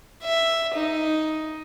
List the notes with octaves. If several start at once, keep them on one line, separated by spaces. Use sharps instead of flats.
E5
D#4